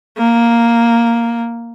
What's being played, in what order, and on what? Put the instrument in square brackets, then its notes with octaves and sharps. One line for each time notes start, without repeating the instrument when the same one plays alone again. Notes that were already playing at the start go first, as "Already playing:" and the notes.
[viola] A#3